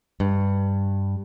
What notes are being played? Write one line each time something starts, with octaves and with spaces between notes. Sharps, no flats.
G2